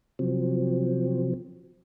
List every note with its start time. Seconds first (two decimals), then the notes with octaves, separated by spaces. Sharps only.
0.19 C3 F3 F#3 C4